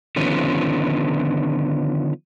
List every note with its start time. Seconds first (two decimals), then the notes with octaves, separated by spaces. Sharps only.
0.16 D3 D#3 F3 B3 C#4